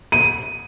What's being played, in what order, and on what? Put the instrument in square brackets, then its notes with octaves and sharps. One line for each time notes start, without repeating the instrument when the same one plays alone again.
[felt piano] D#7